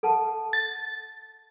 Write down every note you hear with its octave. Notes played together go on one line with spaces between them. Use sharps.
A4 F#5 A5
A6